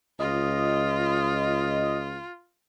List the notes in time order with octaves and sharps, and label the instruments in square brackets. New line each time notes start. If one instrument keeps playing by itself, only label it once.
[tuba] C#2 [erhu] F4 [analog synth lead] D#5